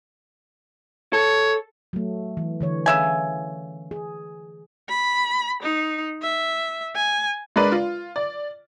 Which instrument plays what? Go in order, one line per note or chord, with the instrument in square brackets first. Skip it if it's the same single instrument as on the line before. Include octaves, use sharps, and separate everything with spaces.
[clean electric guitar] A4 [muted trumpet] C#5
[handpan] F#3 A3
E3
D3 E3 C#5
[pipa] C#3 E5 G#5
[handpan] G#4
[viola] B5
D#4
E5
G#5
[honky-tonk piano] G#3 D4 A#4 B4 D5
F4
D5